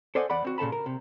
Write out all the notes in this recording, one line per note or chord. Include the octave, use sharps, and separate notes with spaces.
A4 C5 D5 D#5 F#5 G#5
E2 D5 F#5 B5
C4 F#4
A#2 C#3 A4 A5 B5
A#4
C3